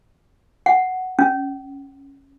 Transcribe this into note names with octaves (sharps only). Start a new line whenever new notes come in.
F#5
C#4